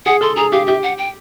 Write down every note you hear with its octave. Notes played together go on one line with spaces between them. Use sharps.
G#4 F#5
A4 C6
G#4 A#5
G4 F5
G4 E5
F#5
G5